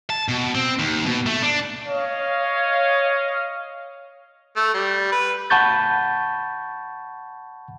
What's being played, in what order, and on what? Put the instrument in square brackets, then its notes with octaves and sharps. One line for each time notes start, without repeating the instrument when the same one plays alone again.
[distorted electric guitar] A5
B2
C4
D#2
B2
A3
D4
[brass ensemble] C#5 D#5 F5
[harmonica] A3
G3
B4
[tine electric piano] F#5 A5 B5 C#6 G6 A6